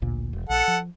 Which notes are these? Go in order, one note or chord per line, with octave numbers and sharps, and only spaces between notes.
A1 D2 A#2
E1
A#1 A4 F#5
F3